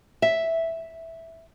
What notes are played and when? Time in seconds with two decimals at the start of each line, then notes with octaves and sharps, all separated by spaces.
0.22 E5